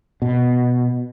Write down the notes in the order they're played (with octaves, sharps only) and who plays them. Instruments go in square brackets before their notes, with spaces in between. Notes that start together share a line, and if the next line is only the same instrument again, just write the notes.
[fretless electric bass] B2